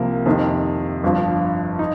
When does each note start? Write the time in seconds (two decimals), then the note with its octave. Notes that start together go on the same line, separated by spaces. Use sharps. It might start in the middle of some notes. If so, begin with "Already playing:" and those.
Already playing: C2 C3 F3 A#3
0.26 F2 C3 D#3
1.03 G1 G2 F3
1.79 D#4